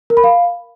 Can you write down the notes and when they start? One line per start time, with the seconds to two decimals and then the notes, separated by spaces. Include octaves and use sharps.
0.10 A#4
0.17 B5
0.24 F5